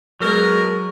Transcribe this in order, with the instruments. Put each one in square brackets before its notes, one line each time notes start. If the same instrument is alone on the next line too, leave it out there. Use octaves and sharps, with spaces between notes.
[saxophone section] B2 A#4 [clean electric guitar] F#3 [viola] G#3